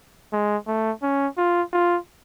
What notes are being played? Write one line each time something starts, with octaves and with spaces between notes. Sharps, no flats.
G#3
A3
C#4
F4
F4